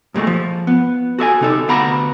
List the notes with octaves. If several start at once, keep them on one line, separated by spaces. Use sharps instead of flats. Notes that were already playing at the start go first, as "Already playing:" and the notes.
G2 A#2 G#3 A3
F3
B3
F#4 A4 E5 G#5
C3 D#4 A4
D2 B3 F5 F#5 A#5 B5